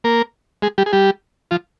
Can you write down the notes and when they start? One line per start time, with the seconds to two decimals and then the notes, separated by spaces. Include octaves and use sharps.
0.04 A#3 A#4
0.62 G#3 G#4
0.78 G3 G4
0.86 G#4
0.93 G3 G4
1.51 F3 F4